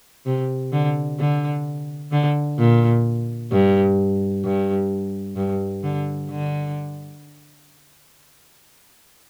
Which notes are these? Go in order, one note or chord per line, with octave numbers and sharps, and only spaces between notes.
C3
D3
D3
D3
A#2
G2
G2
G2
D3
D3